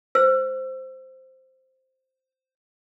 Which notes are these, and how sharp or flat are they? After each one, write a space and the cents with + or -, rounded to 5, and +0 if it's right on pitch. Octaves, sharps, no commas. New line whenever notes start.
C5 +0 E6 +30